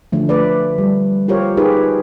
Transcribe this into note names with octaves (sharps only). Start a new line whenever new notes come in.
D3 F3 A3
A3 B4 D5
G3
F4 G4 A#4 C5 C#5
D#4 G4 G#4 A#4 B4